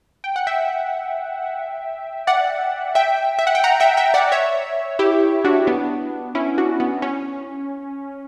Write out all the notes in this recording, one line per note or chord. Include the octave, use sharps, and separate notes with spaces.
G5
F#5
E5 G5
D5 F#5
E5 G5
E5
F#5
G5
F#5 A#5
E5 G5
E5 G5
D5 F#5
C#5 E5
E4 G4
D4 F#4
B3 D4
C#4 E4
D4 F#4
B3
C#4